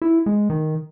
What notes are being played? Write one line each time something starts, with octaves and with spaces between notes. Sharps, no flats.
E4
G#3
D#3